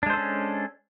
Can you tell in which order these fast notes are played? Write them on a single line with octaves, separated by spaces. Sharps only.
D4 G#3 C5 A4 C#4